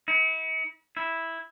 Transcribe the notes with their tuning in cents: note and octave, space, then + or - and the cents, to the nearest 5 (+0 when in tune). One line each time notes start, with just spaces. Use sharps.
E4 -45
E4 -5